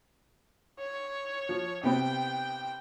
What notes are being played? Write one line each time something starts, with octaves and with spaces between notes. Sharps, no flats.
C#5
F3
C3 B3 C4 G5